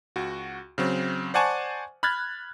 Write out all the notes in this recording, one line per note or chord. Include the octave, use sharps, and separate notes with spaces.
C#2 F#4
C#3 F#3 C4
C5 D5 F#5 G#5 A5 C#6
B5 F6 F#6 G#6 A6